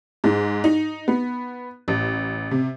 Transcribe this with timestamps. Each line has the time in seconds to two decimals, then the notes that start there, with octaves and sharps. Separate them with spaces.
0.24 G#2
0.64 D#4
1.08 B3
1.88 A1
2.51 C3